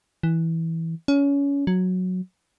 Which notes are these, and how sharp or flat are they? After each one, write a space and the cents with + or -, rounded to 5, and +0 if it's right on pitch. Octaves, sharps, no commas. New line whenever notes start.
E3 -10
C#4 +25
F#3 -10